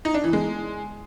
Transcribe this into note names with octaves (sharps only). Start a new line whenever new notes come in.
D#4
D4
E3
G#3